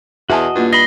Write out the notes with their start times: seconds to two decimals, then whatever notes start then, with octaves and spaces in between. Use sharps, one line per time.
0.30 E2 F#4 D#5 E5 G#5 A5
0.55 G2 A#3 E4 F4
0.73 D#5 B5 A#6 C7 G7